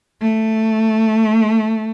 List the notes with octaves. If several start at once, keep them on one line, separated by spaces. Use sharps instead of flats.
A3